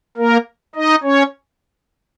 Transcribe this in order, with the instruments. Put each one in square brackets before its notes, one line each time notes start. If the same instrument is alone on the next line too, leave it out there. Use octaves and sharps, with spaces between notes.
[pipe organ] A#3 A#4
D#4 D#5
C#4 C#5